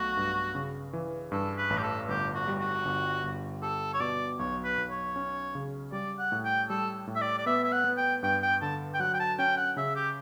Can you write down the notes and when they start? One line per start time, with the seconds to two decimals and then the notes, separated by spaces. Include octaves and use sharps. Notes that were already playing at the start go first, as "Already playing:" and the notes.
Already playing: B1 A3 F#4
0.17 G2
0.55 C#3
0.93 E3
1.32 G2 A4
1.58 B4
1.70 A1
1.78 G4
1.83 A4
2.08 G1 G4
2.34 F#4
2.48 G3
2.60 F#4
2.85 G1
3.23 G1
3.62 G4 A4
3.93 C#5
4.00 B2 D5
4.39 B1 C#5
4.64 B4
4.78 B1
4.91 C#5
5.16 C#4
5.55 C#3
5.92 G3 D5
6.18 F#5
6.32 A2
6.45 G5
6.70 G3 A4
7.07 A2
7.15 E5
7.21 D5
7.38 D5
7.46 B3 E5
7.64 E5
7.72 F#5
7.84 B3
7.97 G5
8.23 G2 G5
8.43 G5
8.62 D3 A5
8.94 G5
9.00 F#3 F#5
9.14 G5
9.19 A5
9.38 C#4 G5
9.57 F#5
9.77 C#3 E5
9.96 G4